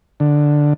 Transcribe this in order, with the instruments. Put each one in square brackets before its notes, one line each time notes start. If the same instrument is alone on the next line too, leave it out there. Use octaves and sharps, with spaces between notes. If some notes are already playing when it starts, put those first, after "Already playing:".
[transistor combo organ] D3